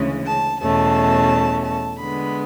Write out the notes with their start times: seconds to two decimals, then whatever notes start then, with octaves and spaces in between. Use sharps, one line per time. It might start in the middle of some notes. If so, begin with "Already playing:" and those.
Already playing: D2 C#3 E3 G#3 C#4
0.26 A5
0.61 E2 B2 A3 C#4 A5
1.64 A5
1.99 D3 G#3 B3 B5